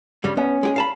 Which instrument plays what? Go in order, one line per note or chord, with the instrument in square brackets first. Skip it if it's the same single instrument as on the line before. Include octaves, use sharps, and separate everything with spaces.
[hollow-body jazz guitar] G2 C#3 G3
[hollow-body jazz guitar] B3 [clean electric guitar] C#4
[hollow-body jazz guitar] G#3 G4 G#4
F5 A5 B5